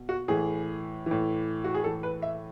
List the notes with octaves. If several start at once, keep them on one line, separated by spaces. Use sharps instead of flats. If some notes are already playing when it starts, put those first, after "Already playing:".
Already playing: B2
F#4
A2 E3 G#4
A2 E3
F#4
G#4
A2 E3 A4
B4
E5